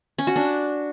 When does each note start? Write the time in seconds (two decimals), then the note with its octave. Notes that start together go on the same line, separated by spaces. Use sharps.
0.18 C#4
0.27 F#4
0.36 D4